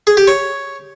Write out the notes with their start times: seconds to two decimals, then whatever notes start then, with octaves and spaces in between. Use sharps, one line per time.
0.07 G#4
0.17 G4
0.27 C#5